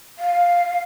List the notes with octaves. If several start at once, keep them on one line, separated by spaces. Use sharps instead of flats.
F5